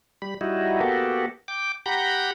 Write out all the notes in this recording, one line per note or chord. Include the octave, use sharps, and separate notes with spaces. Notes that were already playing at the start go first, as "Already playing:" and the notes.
G3 B5
G3 D#4 E4 F#4
A#3 B3 F#4 G4 A4
G5 D6
G4 F#5 A#5 B5 G6